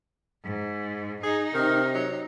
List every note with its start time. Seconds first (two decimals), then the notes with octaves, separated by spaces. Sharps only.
0.45 G#2
1.24 D#4 G#4
1.54 C3 D#3
1.94 F#3